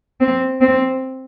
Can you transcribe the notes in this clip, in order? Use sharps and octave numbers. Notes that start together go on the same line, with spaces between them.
C4
C4